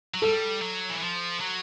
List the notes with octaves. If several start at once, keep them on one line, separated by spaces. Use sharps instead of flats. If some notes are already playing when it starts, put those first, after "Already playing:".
F#3
G3 A4
F#3
E3
F3
F#3